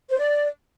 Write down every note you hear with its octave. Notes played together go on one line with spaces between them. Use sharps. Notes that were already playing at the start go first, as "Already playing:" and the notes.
C5
D5